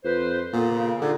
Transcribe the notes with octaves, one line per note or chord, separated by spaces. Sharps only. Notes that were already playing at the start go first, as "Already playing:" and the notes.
F2 B4 C5
A#2 A#3 B3 A4
C#3
D3 D#4 F4 G#4